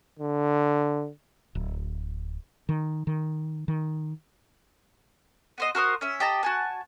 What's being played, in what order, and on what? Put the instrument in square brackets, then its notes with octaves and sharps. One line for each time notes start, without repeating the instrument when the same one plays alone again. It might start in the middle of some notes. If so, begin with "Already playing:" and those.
[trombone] D3
[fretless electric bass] D1
D#3
D#3
D#3
[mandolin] B3 C5 D#5
F#4 A#4 C5 D#6
C#4 E5
G4 D#5 A5 A#5
F#4 G#5 A5